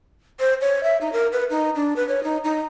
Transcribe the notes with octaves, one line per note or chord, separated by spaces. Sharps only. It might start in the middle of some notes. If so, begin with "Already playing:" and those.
C5
C#5
E5
D#4
A#4
B4
D#4
D4
B4
C#5
D#4
D#4